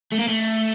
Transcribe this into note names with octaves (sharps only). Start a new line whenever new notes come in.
A3
A#3
A3